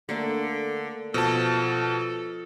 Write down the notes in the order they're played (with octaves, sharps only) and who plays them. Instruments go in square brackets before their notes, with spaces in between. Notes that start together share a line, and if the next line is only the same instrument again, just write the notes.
[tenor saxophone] D3 [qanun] A3 A#3 D4
[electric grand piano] B2 A5 [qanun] F3 [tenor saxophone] A4